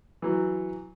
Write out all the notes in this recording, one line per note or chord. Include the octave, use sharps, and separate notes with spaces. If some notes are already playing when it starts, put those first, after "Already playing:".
E3 F#3